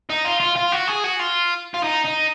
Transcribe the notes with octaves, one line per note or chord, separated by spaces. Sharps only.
D#4
F4
F4
F4
F#4
G#4
F#4
F4
F4
D#4
D#4